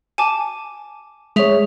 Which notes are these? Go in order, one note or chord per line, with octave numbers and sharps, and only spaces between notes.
G#5 A5 D6
G#3 G#4 C#5 E5 F7